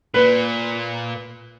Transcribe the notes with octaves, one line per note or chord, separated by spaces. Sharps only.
A#2 B4